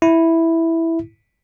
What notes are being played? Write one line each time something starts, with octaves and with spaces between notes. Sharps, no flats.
E4